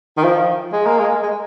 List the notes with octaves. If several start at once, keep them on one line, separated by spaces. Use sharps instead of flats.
D#3
F3
G#3
A#3
G#3
G#3